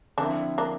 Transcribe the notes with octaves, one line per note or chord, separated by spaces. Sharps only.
D3 F3 A#3 C4 D4 E4
A#3 D4